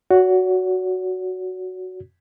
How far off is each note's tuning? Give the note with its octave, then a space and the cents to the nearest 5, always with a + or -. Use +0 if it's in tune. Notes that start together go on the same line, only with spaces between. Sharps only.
F#4 +0 C#5 +40